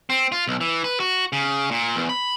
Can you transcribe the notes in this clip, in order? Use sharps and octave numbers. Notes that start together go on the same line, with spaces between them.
C4
F4
B1
E3
B4
F#4
C#3
A#2
E2
B5